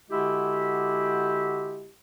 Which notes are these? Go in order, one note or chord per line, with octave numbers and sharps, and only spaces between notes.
D3 G#3 E4 F#4 G4